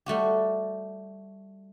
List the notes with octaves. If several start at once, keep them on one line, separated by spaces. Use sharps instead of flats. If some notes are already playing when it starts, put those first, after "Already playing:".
G3 A3 F#4 G4